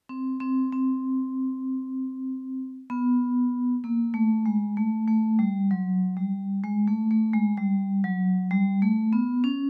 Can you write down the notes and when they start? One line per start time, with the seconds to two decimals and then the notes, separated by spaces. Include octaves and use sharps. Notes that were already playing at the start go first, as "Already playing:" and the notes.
0.09 C4
0.40 C4
0.72 C4
2.90 B3
3.84 A#3
4.14 A3
4.46 G#3
4.77 A3
5.08 A3
5.39 G3
5.71 F#3
6.17 G3
6.64 G#3
6.87 A3
7.11 A3
7.34 G#3
7.57 G3
8.04 F#3
8.51 G3
8.82 A3
9.13 B3
9.44 C#4